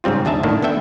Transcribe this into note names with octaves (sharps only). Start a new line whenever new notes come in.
G#2 C#3 G3 C4 F4
D#2 D4 G#4 E5 A5 A#5
A2 D#3 A#3 D4
B3 D4 A4 E5 G5